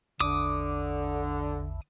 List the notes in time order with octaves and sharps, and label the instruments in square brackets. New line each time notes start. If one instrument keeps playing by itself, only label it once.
[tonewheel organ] A1 E2 [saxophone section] D3 [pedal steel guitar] D6 D#6